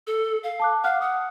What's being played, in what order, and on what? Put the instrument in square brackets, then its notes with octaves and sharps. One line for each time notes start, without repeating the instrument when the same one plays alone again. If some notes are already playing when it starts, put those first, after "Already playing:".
[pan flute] A4
F5
[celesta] A5 D6 F#6
[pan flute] F5 [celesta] F#5 F6 F#6
[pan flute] F#5 [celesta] D#6